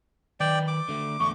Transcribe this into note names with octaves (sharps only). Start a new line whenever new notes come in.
D#3 B4 D5 G5
D6
D3 A3
E2 D3 A3 C#6